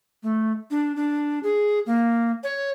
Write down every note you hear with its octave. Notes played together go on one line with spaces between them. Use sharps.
A3
D4
D4
G#4
A#3
C#5